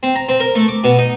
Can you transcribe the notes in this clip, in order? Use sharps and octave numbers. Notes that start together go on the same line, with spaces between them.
C4
A#5
C4
A#4
A3
D6
B2
D#4